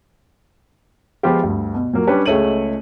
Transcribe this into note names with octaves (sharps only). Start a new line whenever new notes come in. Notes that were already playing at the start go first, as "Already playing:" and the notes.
F3 G#3 B3 F4 G4
D2 G2
B2
A#2 F#3 A#3
G3 C#4 D4 G4 B4 C#5
C#2 G#3 A3 C#5 D#7 F#7